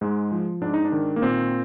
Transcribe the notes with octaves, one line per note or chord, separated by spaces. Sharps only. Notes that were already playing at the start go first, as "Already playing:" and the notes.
G#2 G#3
F3
G#2 D4
D#4
D4
D#3
A#3
A#2 C4